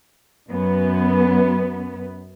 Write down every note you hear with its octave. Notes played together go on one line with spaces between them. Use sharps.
F#2 B3